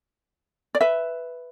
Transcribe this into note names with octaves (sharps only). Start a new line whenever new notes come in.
D5
B4 E5